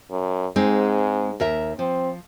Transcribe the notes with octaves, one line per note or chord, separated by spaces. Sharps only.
F#2
G#2 G#3 C4 D#4
D#2 A#4 E5
F3 C4